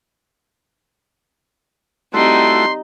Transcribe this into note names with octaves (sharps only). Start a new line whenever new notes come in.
G3 A3 C4 D#4 E4 F#4 C6